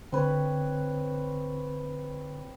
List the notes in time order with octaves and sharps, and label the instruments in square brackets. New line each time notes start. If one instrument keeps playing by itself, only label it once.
[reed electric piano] D3 [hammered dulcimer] C4 B4 C#5